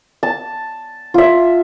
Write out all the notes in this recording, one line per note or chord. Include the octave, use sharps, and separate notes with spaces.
A5
F4 E5